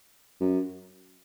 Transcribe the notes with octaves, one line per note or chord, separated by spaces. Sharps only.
F#2